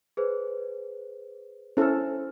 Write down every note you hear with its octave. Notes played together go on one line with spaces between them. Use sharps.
G#4 B4 C5
C#4 E4 A4 C5 F6